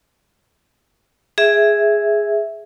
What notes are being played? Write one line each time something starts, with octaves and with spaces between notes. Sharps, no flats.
G#4 E5